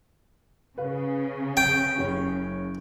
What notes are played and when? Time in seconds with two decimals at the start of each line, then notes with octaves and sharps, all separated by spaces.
0.78 C#3 B4 F5
1.57 G5
1.99 F#1 C#5